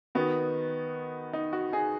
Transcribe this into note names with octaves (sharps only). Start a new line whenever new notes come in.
D#3 B3 D#4 F#4
D#4
F#4
D#4 G#4